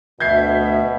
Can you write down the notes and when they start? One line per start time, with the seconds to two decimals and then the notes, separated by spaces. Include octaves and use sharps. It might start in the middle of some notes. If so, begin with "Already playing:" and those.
0.20 D2 B2 E5 G6 G#6 C7